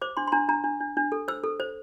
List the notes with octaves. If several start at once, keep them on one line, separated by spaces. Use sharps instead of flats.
C5 D6
D4 C6
C6
D4 A#5
D4 A#5
D4
D4
D4
A4
C5 E6
A4
C5